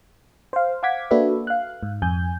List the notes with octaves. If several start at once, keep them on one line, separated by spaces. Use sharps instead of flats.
C5 F5
F5 F#5 D6 G#6 B6
A#3 D4 F#4 A4 B4 E5
F5 F#6
G#2
F2 G#5 G6